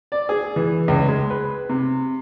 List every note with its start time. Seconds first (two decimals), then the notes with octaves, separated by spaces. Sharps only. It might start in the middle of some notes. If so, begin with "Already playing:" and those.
0.12 D5
0.29 G#4
0.56 E3
0.88 C#2
1.08 G#3
1.30 B4
1.69 C3